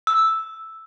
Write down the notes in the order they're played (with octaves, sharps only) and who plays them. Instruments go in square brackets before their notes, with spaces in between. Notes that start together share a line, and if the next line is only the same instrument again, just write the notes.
[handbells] E6